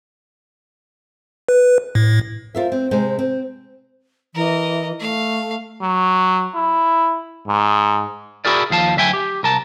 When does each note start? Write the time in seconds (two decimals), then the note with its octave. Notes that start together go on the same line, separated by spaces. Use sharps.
1.49 B4
1.95 A2
2.55 F4 A#4 C5 E5
2.72 C4
2.91 C3 G#3 C4
3.19 C4
4.35 E3 A#4 D#5
5.00 A3 F5
5.81 F#3
6.55 E4
7.48 G#2
8.45 E4 F#4 G#4 A#4 D5
8.70 D#2 F3 F5 A5
8.96 D2 F#3 E5 G5 G#5
9.13 G4
9.43 C2 A#4 A5